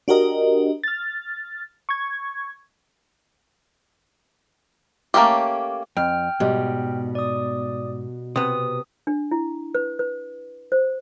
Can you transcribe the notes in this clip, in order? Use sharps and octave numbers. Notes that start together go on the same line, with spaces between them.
D4 F#4 G4 A#4 D#5
F6 A6
C#6 G#6
A3 A#3 C4 C#4 G4
F2 G5 F6
G#2 B2 G3
D5 D#6
C3 B3 D#6
D4
E4
B4
B4
C5